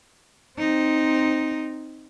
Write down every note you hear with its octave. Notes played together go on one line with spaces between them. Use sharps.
C4 D#4